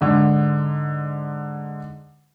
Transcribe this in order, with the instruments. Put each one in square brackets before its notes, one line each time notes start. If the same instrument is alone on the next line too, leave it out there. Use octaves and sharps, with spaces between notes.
[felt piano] G#2 D3